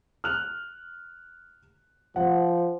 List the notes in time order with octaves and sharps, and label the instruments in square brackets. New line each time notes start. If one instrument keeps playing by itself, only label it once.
[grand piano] F6 F#6 F7
[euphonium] F3 [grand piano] F#5